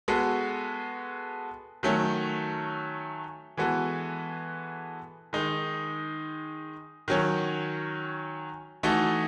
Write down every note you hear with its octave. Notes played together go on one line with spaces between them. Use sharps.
G#3 B3 F#4 A4
D#3 F#3 A3 C#4
E3 G#3 B3 F#4 A4
D#3 G#3 D#4
D#3 F#3 C#4
E3 A3 D#4 F#4 A4